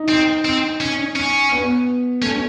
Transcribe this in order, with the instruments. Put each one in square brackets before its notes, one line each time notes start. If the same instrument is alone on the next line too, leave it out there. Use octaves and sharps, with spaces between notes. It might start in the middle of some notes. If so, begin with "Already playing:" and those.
Already playing: [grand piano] D#4
[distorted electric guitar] C4
C4
C#4
C#4
[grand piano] B3
[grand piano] A3 [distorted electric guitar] C#4